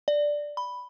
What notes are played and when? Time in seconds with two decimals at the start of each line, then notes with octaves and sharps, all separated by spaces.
0.08 D5
0.57 B5